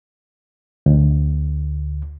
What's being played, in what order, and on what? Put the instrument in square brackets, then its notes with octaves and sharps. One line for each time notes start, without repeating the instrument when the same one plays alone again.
[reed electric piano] D2